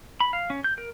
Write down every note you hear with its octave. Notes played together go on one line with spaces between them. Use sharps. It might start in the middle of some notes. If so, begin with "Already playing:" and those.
B5
F5
C#4
G6
A#4